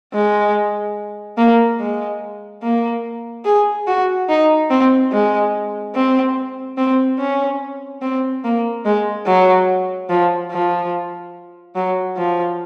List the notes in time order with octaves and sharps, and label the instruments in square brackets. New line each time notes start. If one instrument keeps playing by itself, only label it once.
[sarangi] G#3
A#3
G#3
A#3
G#4
F#4
D#4
C4
G#3
C4
C4
C#4
C4
A#3
G#3
F#3
F3
F3
F#3
F3